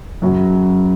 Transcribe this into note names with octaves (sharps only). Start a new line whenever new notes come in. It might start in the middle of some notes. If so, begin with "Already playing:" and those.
F#2 C#3 F#3